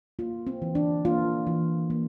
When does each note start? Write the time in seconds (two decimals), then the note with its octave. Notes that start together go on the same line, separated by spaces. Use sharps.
0.19 A#3 F4
0.47 C4
0.62 E3
0.75 D4
1.05 A#3 F4
1.47 E3
1.90 A#3